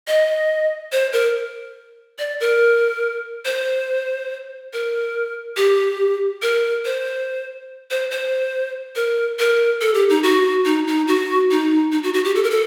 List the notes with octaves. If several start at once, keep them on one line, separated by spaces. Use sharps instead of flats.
D#5
C5
A#4
D5
A#4
C5
A#4
G4
A#4
C5
C5
C5
A#4
A#4
A4
G4
D#4
F#4
D#4
D#4
F#4
D#4
D#4
F#4
F#4
G4
A4
A#4
A4